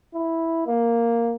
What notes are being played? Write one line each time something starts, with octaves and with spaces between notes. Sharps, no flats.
E4
A#3